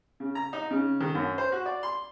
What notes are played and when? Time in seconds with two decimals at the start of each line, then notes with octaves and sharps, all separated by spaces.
0.20 C#3
0.35 A#5
0.53 D#4
0.71 C#3
1.00 D#3
1.15 F#2
1.38 C5
1.52 F#4
1.66 D5
1.83 C6